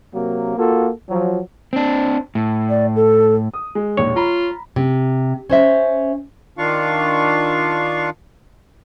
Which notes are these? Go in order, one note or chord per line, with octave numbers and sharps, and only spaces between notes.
C3 F#3 A#3
A#3 F4 F#4 A4
F3 F#3
C4 D4
A2
D5
A4
D#6
G#3
E1 A#1 D#2 C#5
F4 A#5 B5
C3
C#4 C5 E5
D#3 D4 F4 F5 C#6